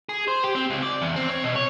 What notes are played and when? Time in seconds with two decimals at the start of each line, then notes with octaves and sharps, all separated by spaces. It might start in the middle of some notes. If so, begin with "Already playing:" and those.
0.09 G#4
0.27 C5
0.44 G4
0.55 C4
0.70 C#2
0.82 D5
1.02 E2
1.16 C4
1.29 C#5
1.44 B2
1.56 C#5